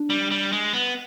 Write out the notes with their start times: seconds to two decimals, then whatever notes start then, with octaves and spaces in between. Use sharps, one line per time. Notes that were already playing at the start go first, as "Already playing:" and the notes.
Already playing: D4
0.10 G3
0.31 G3
0.52 G#3
0.73 B3